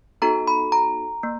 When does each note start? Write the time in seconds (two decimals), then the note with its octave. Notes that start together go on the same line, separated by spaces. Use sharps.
0.22 B3 D#4 F#4 A4 A#5
0.47 B5
0.72 A#5
1.23 A#3